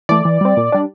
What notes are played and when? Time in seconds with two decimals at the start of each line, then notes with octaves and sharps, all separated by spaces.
0.09 E3 A3 D5
0.25 E3
0.41 G3 C4
0.57 A#2
0.72 G3 D4